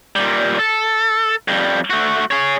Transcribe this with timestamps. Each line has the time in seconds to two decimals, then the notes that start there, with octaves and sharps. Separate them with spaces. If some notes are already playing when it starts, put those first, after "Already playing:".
0.16 A#2 G3
0.59 A4
1.48 F2 G3
1.90 A3 F#4
2.31 G#4 C#5